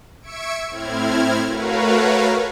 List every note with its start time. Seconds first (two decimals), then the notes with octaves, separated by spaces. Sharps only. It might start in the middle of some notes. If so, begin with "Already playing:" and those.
0.22 E5 C#6 E6 G#6 C#7 D7
0.69 A2 C4 E4 F6 G#6
1.48 A3 F#4 A#4 B4 C#5 F5